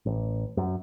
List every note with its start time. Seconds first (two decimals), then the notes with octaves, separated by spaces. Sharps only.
0.06 A1
0.57 F#2